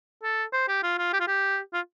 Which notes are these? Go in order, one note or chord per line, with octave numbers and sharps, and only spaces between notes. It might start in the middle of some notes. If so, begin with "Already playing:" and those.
A4
C5
G4
F4
F4
G4
F4
G4
F4